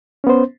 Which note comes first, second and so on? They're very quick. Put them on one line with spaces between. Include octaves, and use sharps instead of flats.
C#4 B3 C5